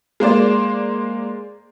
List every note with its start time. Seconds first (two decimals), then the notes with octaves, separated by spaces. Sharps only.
0.20 G#3 A#3 C5 D5